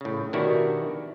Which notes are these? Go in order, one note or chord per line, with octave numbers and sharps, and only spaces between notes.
A2 C#3
B2 D#3 D4 E4 F#4 G4